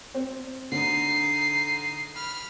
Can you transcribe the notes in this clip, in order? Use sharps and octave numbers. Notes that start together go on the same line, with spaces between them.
C4
D3 D#4 C7
B5 F6